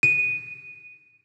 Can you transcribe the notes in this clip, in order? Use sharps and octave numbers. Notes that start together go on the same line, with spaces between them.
D#7